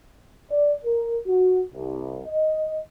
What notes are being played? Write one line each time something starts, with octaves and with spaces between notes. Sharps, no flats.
D5
A#4
F#4
C2
D#5